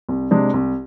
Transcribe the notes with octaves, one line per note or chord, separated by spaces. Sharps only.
C2
C3 G#3 D4
C2